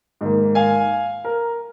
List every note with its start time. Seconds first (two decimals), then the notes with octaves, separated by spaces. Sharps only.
0.21 G#2 D#3 A#3
0.55 F5 G#5
1.24 A#4